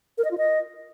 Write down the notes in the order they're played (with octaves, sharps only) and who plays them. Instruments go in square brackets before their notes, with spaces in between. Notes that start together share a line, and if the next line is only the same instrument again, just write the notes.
[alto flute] A#4
D#5
F4
D#5